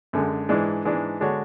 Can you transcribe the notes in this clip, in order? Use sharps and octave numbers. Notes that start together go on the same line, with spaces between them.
F#2 D3 G#3
G#2 E3 G#3 D4
G#2 E3 G#3 D4
D3 G#3 D4 F#4 C#5